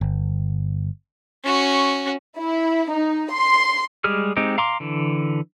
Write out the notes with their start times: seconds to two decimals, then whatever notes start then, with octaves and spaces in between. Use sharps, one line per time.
0.01 G1
1.44 C#4 F#4
2.37 E4
2.90 D#4
3.31 C6
4.04 G3 G#3 G4 G#4 F6
4.37 G#3 C4 D#4 G4
4.58 F5 A#5 C6 D6
4.80 D3 E3